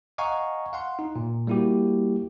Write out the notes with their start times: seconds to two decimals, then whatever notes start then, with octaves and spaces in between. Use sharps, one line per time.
0.18 D#5 F5 F#5 G#5 A#5 C#6
0.73 F5 F#5 C6
0.99 D#4
1.16 A#2
1.47 G3 A#3 E4 F#4 G4